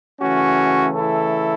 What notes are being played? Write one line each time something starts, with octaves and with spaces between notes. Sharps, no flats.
C#3 E3 A3 C#4 F#4
E4 A4